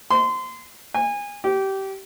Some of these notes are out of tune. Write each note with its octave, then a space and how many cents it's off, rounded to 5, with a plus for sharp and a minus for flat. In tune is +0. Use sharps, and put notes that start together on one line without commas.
C6 -25
G#5 -25
G4 -20